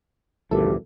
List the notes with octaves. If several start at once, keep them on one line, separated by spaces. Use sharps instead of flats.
G#1 C#2 F#2 A#2 E3 G4 A4